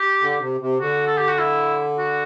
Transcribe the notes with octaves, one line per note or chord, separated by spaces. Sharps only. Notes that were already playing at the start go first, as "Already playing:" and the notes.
Already playing: G4
D3
C3
C3
D3 F#4
A4
G4
F#4
E4
F#4